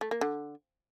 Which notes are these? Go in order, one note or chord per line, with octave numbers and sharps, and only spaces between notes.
A3
A#3
D3